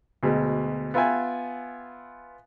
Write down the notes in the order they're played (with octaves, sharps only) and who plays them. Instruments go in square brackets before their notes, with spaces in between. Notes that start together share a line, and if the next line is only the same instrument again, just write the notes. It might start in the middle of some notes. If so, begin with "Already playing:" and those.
[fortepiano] D2 B2 G#3
B3 F4 B4 E5 G5 G#5